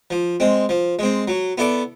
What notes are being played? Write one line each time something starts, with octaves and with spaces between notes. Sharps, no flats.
F3
G#3 C4
F3
G#3 C4
F#3
B3 E4 A4 D5